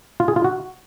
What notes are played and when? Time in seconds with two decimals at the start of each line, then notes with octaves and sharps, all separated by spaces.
0.20 F4
0.28 G#4
0.36 F4
0.44 F#4